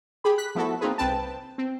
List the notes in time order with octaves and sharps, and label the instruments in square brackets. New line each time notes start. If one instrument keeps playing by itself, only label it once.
[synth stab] G4 G#4 B5
F#6 B6
F3 A3 B3 E4 F#4 A4
A#3 C4 D#4 F4 G#4 B4
C2 C4 B4 G5 A5
C4